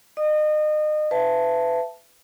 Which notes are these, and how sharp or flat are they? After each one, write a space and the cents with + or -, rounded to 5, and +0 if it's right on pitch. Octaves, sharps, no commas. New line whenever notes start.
D#5 -35 D#6 -25
B4 +30 E5 +25 A5 +0